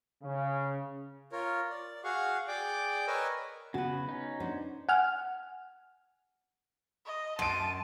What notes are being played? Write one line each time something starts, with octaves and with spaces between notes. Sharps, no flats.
C#3
F4 A#4 C#5
D5
F#4 G#4 F5 F#5 C#6
G#4 D5 G5 D6
A#4 B4 C#5 D#5 G#5 E6
C#3 B3 F#4 B4
C#4 D#4
B3 D4 C5
F#5 G#5 F6
D#5
F#2 A5 C6 D7 D#7